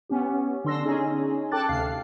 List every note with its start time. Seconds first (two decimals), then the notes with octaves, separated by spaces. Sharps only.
0.09 B3 C#4 G4
0.64 D3 D4 C6 E6 A#6
0.85 C#4 D#4 G#4
1.52 A4 G5 A5 D6 F#6 A6
1.69 D2 C3 F5 C7